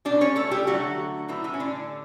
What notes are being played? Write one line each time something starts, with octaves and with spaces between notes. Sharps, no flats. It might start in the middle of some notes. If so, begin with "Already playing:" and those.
B2 G3 D4 D5
C#4 C#5
A3 A4
G3 G4
D3 F#3 A3 F#4
A2 E3 G3 E4
E3 E4
C#4
D3 D4